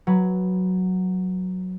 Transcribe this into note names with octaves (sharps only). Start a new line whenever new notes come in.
F#3 B4